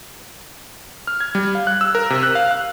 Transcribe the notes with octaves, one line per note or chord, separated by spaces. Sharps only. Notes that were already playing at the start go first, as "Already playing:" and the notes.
F6
G#6
G3
F5
F#6
E6
A#4
C3
F#6
F5
F#6